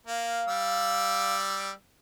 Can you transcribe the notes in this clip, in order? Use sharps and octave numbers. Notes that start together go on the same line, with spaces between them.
A#3 F5
G3 D5 E6